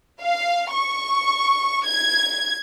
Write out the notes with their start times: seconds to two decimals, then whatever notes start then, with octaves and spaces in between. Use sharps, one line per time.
0.22 F5
0.72 C#6
1.86 G#6